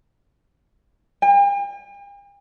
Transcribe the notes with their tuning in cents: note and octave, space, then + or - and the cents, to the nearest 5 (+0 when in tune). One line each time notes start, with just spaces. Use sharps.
G5 +45